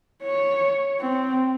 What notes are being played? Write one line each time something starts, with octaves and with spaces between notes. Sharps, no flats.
C#5
C4